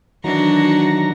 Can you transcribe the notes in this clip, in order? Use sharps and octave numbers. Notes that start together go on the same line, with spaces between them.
D#3 E3 F#3 D4 F#4 A#5